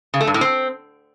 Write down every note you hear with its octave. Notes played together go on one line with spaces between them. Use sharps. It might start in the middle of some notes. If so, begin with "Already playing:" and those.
C#3
A3
G2
A2
C4